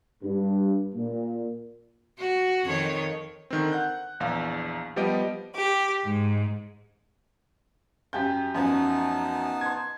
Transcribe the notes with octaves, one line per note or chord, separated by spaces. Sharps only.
G2
A#2
F#4
F2 D#3 C#5
D3 D#3 C4
F#5 F#6 G6
A#1 E2 F5
F3 G3 B3 G4 D#5 D7
G4
G#2
F#2 G4 G6
F#2 F3 B3 C#4 D#4 A5
C6 G#6